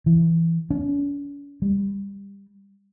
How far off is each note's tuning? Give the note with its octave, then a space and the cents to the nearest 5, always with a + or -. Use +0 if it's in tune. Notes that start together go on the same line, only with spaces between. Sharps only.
E3 +10
C#4 +45
G3 +20